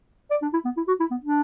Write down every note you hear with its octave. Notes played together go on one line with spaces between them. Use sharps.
D5
D4
E4
B3
E4
F#4
E4
B3
D4